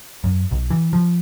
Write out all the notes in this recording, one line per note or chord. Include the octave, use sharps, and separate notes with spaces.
F#2
B1
E3
F3